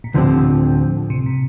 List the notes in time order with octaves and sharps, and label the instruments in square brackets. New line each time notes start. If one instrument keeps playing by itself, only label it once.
[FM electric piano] A#2
[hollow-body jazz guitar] D2 D3 F3 C4 G4 [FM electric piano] A2
[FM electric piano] C3
A#2